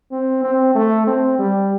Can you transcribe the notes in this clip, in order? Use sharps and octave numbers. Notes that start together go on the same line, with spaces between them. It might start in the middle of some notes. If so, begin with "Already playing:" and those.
C4
C4
A3
C4
G3